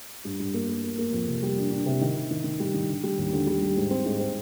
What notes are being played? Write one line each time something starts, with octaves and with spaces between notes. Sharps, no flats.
G2
G2
A#3
A#3
A#3
A#3
F2
C3
G3
D4
D4
C3
D#3
D#3
D#3
D#3
G3
D#3
D3
G3
D#2
D3
G3
G3
G#2
C4
G#2
C4